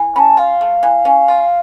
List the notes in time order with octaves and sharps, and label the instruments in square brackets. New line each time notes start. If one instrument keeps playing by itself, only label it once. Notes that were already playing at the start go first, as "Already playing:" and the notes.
Already playing: [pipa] E3
[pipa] C#4 [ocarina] A5 B5
[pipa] F4 [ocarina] F5
[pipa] A3
E3
C#4
F4